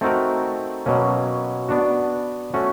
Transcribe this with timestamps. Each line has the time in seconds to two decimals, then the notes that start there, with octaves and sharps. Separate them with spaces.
0.01 A3 C4 D#4 F#4 A#4
0.86 B2 F#3 A#3 C#4
1.69 B3 D4 F#4
2.54 A3 C#4 F#4